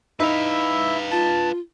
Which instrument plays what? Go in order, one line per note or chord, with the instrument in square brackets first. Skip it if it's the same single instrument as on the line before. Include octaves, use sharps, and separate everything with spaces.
[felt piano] D#4 [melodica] E4 E5 [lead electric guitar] B4 F5
[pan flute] F4 [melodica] A5